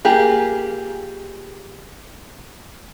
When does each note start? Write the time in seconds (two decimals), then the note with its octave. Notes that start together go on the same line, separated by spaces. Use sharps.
0.05 A#3 F4 G4 G#4